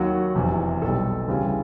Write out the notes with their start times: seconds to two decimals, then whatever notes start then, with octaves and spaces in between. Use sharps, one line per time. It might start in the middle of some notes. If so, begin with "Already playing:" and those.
Already playing: D#2 D#3 F#3 F#4
0.35 F1 E2 C3
0.82 B1 B2 G3 A4
1.28 D2 C#3 E3 G3